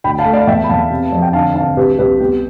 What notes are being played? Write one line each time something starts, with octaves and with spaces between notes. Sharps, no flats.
D2 G5 B5
F5 A5
A3
D5 F5
E2 E5 G5
B5
E2 F5 A5
C3
F2
G5
D3 F5 A5
D3 F5 A5
C2 G4 B4
C2 G4 B4
B3 G4